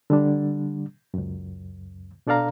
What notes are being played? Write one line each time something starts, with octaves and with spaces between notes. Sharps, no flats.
D3 G3 D4
C#2 F#2
B2 D4 A4 D5 F5 A#5